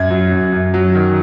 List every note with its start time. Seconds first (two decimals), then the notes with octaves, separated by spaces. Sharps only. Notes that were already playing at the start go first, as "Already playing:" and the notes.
Already playing: F#2 G#6
0.11 F#3
0.32 F#2
0.52 F#2
0.74 F#3
0.95 D#3